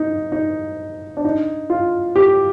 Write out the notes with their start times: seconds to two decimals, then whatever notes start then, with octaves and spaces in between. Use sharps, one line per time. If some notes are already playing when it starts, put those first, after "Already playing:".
Already playing: D#4
0.32 D#4
1.17 D4
1.25 D#4
1.70 F4
2.16 G4